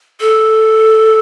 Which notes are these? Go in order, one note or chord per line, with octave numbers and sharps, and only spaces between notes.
A4